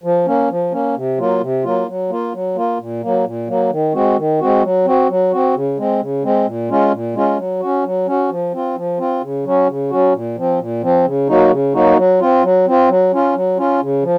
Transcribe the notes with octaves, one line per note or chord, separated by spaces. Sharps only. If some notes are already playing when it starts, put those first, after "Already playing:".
F3
A#3 C#4
F3
A#3 C#4
C3
F#3 A#3 F4
C3
F#3 A#3 F4
F#3
A#3 F4
F#3
A#3 F4
A#2
F#3 A#3
A#2
F#3 A#3
D#3
G#3 C4 F#4
D#3
G#3 C4 F#4
F#3
C4 F#4
F#3
C4 F#4
C#3
G#3 C4
C#3
G#3 C4
A#2
G#3 C#4 F4
A#2
G#3 C#4 F4
F#3
C#4 F#4
F#3
C#4 F#4
F3
C4 F4
F3
C4 F4
C#3
F#3 C#4 F#4
C#3
F#3 C#4 F#4
A#2
F3 C4
A#2
F3 C4
C#3
F#3 A#3 D#4 F#4
C#3
F#3 A#3 D#4 F#4
F#3
C4 F4
F#3
C4 F4
F#3
C#4 F4
F#3
C#4 F4
C#3
F3